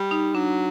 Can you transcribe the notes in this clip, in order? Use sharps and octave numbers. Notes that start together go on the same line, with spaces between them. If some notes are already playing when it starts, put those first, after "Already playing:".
Already playing: G3
D#4
F#3 D4